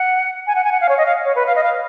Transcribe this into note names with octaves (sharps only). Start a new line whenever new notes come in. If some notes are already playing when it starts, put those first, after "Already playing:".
Already playing: F#5
G#5
F#5
G#5
F#5
F5
C#5
D#5
F5
C#5
B4
F5
D#5
F5